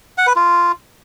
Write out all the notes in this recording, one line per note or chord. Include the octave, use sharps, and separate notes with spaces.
F#5
B4
F4